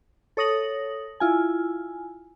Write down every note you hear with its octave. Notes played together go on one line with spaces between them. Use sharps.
A4 C#5 D#6 A#6 F#7
E4 F4 G#5